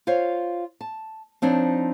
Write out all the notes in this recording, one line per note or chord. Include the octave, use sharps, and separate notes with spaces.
F4 C5 C#5 F5
A5
F3 C4 D4 D#4 C#5